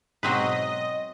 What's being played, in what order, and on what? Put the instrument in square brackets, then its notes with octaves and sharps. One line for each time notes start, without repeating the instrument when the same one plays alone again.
[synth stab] G#2 B2 [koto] F#3 C4 B4 [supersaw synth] D#5